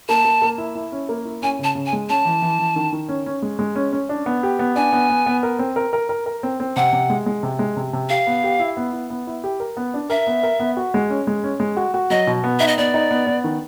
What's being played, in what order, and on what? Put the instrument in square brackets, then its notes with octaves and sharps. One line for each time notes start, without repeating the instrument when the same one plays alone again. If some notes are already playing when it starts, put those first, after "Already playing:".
[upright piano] A#3 [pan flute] A5
[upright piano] A#3
A#3
E4
E4
C#4
A#3
E4
[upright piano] C#4 [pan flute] G#5
[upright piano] C#3 [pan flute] A5
[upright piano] C#3
[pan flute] G#5
[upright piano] G#3
[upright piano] C#4 [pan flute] A5
[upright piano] E3
E3
E3
D#3
D#3
C#4
C#4
G#3
G#3
C#4
C#4
D4
B3
G4
B3
[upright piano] D4 [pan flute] G#5
[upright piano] B3
B3
B3
A#4
C4
A#4
A#4
A#4
A#4
C4
C4
[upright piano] C3 [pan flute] F#5
[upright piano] C3
G#3
G#3
C3
G#3
C3
C3
[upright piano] G4 [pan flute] F5
[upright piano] B3
G4
E4
B3
E4
B3
E4
G4
A#4
B3
D4
[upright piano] A#4 [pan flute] E5
[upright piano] B3
A#4
B3
F#4
G#3
C#4
G#3
C#4
G#3
F#4
F#4
[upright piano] F#3 [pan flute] D#5
[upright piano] B2
B3
[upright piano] D#4 [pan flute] E5
[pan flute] D#5
[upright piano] B3 [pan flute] D5
[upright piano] D#4
B3
B3
D#3